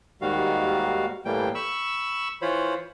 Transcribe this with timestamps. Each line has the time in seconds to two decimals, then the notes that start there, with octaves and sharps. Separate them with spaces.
0.21 D#2 G#2 D#3 G3 F#4 F5
1.25 A2 E3 G3 A#3 G5
1.55 B5 C#6 E6
2.42 E3 F4 C5 C#5 B5